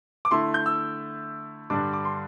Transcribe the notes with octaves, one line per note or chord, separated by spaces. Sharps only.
D6
D3 A3 E4 C6
G6
E6
G2 D3 G3 D4 D6
D6
C6